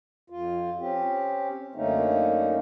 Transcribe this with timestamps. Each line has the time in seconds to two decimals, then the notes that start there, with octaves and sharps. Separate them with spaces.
0.30 F2 F4
0.80 C4 C#4 G4
1.75 F#2 D3 A3 A#3 C#4 D#4